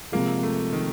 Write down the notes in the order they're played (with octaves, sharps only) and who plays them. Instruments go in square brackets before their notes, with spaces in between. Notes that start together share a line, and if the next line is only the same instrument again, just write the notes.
[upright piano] C3 F3 G#3 [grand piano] A#3
[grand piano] A3
D#3